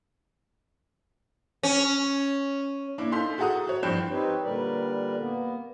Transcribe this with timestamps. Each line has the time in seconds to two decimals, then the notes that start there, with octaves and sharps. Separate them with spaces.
1.63 C#4
2.98 A#3 D4 E4
3.11 D#4 F4 A4 C6 G6 B6
3.38 F#4 G#4 A4 F#5 A#5 D#6
3.67 F#4 C#5
3.83 G2 F3 G5 G6 C7 E7
4.10 C4 D#4 G4 B4 C#5
4.44 A#2 D3 G3 A#4 B4 D5
5.19 A#3 B3